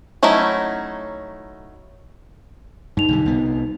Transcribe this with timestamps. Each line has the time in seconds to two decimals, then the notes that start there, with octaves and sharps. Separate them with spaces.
0.23 F#3 A3 C#4 D#4 E4
2.97 G2 D#4 F7
3.09 B1 D3 G3
3.26 C2 B3